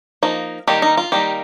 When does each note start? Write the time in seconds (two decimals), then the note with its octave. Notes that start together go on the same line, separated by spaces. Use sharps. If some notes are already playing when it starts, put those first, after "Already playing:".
0.23 F3 A#3 D#4
0.67 D#3 G3 A#3 D#4 G4
0.82 D#4
0.97 F4
1.12 D#3 G3 A#3 D#4 G4